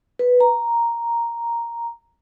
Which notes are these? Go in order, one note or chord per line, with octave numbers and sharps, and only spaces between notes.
B4
A#5